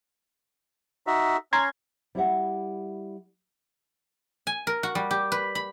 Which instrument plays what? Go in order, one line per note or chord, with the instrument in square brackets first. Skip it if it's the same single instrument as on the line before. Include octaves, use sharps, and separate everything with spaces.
[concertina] D#4 F#4 E5
[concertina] C#4 [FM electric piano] A#5 C6 G#6
[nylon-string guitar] G3 E4 G4 D#5 E5 F#5
[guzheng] G#5
A#4
F#4
G3
G4
B4
B5